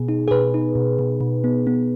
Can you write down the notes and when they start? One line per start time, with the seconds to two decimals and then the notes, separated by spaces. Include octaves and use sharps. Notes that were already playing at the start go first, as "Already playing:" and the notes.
Already playing: B2 B3 G#4
0.09 D#4
0.28 G#4
0.31 B2 B4
0.54 D#4
0.75 B2
0.99 B2
1.21 B2
1.44 B3
1.67 B3